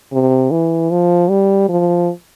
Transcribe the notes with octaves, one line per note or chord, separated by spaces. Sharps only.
C3
E3
F3
G3
F3